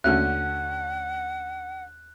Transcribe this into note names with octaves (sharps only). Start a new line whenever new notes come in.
D#2 D3 A3 C#4 F#4 F#5 F6 F#6